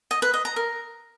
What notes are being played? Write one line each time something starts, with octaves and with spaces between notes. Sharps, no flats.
D#5
B4
D#5
A#5
A#4